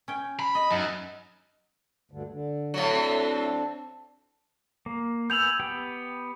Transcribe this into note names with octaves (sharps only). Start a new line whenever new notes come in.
C#4 G5
B5
D#5
F#2 D#4
D2 G2 D3
D3
A2 F#3
C4 D4 A4
A#3
B3 G#5 E6 G6 F7 F#7
B3 G4 G5